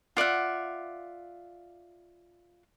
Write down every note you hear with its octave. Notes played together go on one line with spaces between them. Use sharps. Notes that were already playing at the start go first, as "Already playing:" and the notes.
F4 D5 E5 F#5